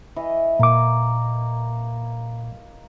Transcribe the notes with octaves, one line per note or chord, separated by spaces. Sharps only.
E3 D#5
A#2 A#3 D6